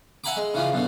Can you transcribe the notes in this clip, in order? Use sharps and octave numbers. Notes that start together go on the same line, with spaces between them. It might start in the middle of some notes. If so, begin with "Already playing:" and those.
E5 F#5 G#5 A#5 B5 D6
G#3
C#3 E3 F3 C#4
F#2 B2 D3